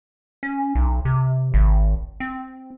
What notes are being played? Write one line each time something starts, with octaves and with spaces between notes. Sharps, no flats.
C#4
B1
C3
G#1
C4